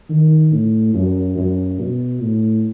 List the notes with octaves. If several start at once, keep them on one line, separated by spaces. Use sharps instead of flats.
D#3
A2
F#2
F#2
B2
A2